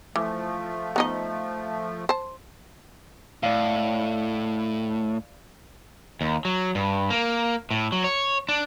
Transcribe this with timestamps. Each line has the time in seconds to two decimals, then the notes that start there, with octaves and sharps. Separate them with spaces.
0.16 E3 F3 A3
0.96 B3 D#4 D#5
2.09 C5 A5
3.43 A2 D5 F5
6.21 D#2
6.45 F#3
6.75 G2
7.10 A#3
7.71 A2
7.92 F#3
8.04 C#5
8.49 D4